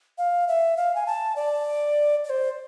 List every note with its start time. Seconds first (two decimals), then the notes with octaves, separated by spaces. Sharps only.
0.18 F5
0.48 E5
0.77 F5
0.95 G#5
1.07 A5
1.36 D5
2.24 D5
2.29 C5